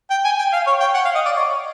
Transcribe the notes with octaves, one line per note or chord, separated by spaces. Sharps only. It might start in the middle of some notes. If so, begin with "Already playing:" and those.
G5
G#5
G5
F5
C#5
G5
F#5
F5
D#5
D5
C#5